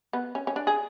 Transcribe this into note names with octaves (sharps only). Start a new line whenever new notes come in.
B3
C#4
C#4
D4
G#4